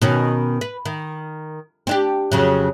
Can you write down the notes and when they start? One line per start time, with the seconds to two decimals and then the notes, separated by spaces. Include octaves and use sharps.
0.02 B2 D#3 C#4
0.61 B4
0.85 D#3
1.87 C4 D4 G4
2.32 F2 C#3 F#3